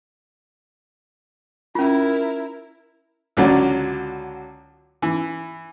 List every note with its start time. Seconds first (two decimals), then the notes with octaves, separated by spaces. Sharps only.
1.75 C#4 E4 F4 A#4
3.37 C#2 D3 F#3 D5
5.02 E3